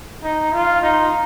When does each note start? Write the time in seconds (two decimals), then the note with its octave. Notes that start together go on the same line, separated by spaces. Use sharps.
0.23 D#4
0.53 F4
0.83 D#4